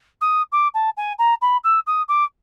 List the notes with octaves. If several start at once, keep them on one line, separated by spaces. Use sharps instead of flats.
D#6
D6
A5
G#5
A#5
B5
E6
D#6
D6